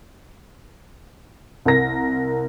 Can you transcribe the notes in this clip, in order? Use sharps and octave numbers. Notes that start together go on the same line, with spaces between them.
C2 A#4 A#6